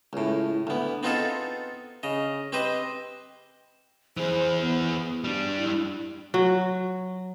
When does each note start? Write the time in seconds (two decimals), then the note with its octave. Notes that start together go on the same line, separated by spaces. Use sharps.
0.13 C#2 A2
0.67 D2 B3
1.03 B3 C4 D#4 F4 G#4 A4
2.03 C#3 D#5
2.52 C4 G4 B4 C5 D#5
4.17 E3 G#4 C5
4.62 B3
5.24 G3 D4
5.57 E4
6.34 F#3